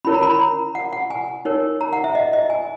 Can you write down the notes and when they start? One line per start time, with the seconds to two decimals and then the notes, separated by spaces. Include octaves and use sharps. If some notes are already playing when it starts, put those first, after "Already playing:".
0.05 C#4 E4 A#4 C#5 B5
0.14 A#5
0.23 B5
0.31 A#5
0.75 F#5
0.93 F#5
1.10 G#5
1.45 D#4 A#4 C#5
1.81 A#5
1.93 F#5
2.04 E5
2.15 D#5
2.33 D#5
2.50 G#5